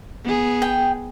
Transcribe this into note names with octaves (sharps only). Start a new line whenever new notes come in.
B3 G#4
G5